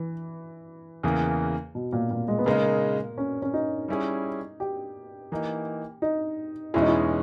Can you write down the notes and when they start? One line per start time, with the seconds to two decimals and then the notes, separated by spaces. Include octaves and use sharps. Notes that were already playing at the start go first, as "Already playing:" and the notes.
Already playing: E3
1.03 E2 C#3 E3 A#3
1.75 B2
1.93 A#2
2.11 A#2
2.28 G#3
2.38 B3
2.46 C#3 G#3 A#3 D#4 A#4
3.18 C#4
3.42 C#4
3.54 D#4
3.88 G3 C#4 E4 G#4
4.60 G4
5.32 E3 A#3 D#4
6.02 D#4
6.74 E2 B2 G#3 C#4 E4
6.81 D#4
6.88 E4